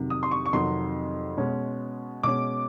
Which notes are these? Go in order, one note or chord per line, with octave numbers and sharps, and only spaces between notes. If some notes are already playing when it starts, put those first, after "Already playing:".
Already playing: F2 C3 D#3 F#3
D#6
C6
C#6
C#6
F2 C3 D#3 F#3 C6
B2 G#3 C#4
B2 G#3 C#4 D6